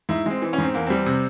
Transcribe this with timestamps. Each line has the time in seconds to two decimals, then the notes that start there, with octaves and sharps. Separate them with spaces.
0.09 G#2 E4
0.26 G#3 C4
0.42 E3
0.53 C#4
0.58 G#2 C4
0.74 E2 A#3
0.87 G3 C4
1.06 C3